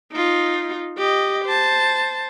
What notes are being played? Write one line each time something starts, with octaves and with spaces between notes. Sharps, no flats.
D#4 F4
G4 D#5
C5 A5